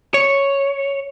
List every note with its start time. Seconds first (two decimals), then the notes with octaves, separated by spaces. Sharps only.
0.14 C#5